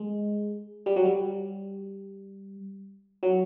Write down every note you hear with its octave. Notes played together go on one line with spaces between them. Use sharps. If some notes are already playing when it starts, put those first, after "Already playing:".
Already playing: G#3
G3
F#3
G3
F#3